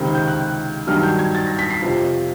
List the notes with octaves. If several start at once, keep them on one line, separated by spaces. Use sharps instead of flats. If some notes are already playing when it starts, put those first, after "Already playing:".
Already playing: C#2 C3 D#3
G6
F#6
G2 D#3 F#3 F6
G6
G#6
A6
A#6
B6
C7
F2 C3 F3